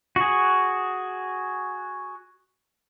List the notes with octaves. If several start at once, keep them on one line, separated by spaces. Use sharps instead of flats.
F#4 G#4